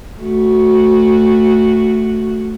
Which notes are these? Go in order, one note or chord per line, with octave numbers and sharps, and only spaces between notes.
A3 F#4